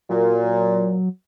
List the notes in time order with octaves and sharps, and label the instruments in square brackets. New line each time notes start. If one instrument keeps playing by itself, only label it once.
[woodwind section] A#2 [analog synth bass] F#3